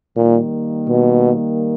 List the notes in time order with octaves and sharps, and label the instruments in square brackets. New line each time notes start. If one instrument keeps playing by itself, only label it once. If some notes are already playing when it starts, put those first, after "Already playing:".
[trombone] A#2 [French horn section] D#3 G3 A#3
[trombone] B2